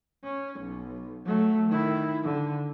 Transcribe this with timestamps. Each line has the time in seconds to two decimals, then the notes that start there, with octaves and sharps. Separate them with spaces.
0.24 C#4
0.60 B1
1.25 F#3 A3
1.69 D#3 E4
2.23 D3